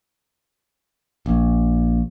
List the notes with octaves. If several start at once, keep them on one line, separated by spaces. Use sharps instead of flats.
A#1